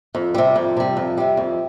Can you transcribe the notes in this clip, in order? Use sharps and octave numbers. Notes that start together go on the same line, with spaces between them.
F2
C3 G3
F2
C3 G3
F2
C3 G3
F2